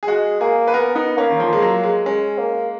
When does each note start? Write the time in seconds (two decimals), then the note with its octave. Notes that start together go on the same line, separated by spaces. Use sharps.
0.03 G#4
0.07 G#3 F#4
0.41 A#3 G#4
0.67 B4
0.74 B3 A#4
0.95 B3 D#4
1.18 A#3 C#4
1.30 D#3
1.40 F3
1.53 G#3
1.62 F#3
1.83 G#3
2.06 G#3 C#4
2.38 A#3